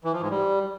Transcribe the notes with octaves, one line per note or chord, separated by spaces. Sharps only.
E3
F3
G#2
G3